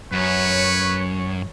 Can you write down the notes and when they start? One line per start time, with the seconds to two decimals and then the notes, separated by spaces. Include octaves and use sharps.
0.12 F#2 B4 C#5